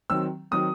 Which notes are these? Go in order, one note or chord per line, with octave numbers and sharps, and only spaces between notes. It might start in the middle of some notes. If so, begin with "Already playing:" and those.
D#3 F#3 C4 E6
D#3 F#3 C4 D#6